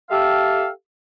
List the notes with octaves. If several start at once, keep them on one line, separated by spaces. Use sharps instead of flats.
G4 A4 E5 F5